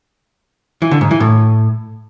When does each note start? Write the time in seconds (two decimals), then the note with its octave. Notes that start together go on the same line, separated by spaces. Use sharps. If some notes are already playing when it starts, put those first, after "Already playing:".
0.82 E3
0.91 D3
1.01 G#2
1.11 E3
1.20 A2